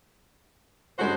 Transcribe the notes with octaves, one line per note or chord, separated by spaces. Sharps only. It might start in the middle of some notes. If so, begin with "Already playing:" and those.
G2 G#3 C#4 F#4 C5